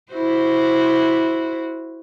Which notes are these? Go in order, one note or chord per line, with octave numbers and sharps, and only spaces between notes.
E4 F#4 C5